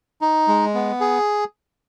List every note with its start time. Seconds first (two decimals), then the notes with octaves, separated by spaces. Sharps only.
0.21 D#4
0.48 G#3
0.75 B3
1.00 G#4